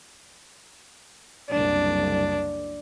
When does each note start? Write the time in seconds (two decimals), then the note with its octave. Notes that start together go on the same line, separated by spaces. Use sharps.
1.50 F#1 C2 D4